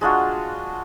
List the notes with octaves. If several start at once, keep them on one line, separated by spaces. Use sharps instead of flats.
G#3 D4 F4 F#4